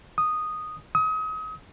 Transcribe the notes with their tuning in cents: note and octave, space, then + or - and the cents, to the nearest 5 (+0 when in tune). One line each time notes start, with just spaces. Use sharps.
D#6 -5
D#6 +35